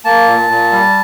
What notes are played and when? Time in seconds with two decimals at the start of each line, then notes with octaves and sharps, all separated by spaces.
0.05 A#3 A5
0.27 A#2
0.50 A#2
0.72 G3